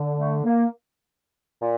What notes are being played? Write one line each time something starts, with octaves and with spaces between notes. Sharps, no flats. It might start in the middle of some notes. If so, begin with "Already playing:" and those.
Already playing: D3
A3
A#3
A#2